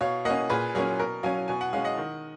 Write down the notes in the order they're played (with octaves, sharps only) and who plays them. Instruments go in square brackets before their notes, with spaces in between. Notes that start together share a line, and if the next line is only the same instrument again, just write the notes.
[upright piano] B2 C#5 F5
A#3 C#4 D#5 F#5
A#2 G#4 B4
F#3 A#3 C#4 G#4
B2 A#4
F#3 C#4 F5 G#5
B2 G#5
F#5
G#3 C#4 F5
D#5 F#5
D#3